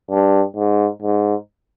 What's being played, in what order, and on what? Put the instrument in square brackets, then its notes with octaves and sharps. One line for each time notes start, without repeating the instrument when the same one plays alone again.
[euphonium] G2
G#2
G#2